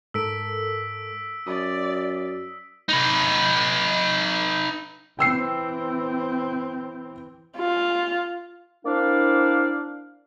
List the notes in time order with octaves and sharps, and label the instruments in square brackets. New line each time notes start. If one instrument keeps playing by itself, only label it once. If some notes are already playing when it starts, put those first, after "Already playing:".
[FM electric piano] G#2 A4 A#4 [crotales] E6 B6 D7
[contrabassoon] F#2 [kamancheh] D5 [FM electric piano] D#6
[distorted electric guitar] D#4 B4
[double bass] E3 C4 [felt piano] G5 E6 C7
[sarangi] F4
[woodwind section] A#3 C4 D4 E4 D5 F5